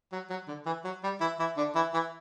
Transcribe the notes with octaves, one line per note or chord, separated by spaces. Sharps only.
F#3
F#3
D3
E3
F#3
G3
E3 E4
E3 E4
D3 D4
E3 E4
E3 E4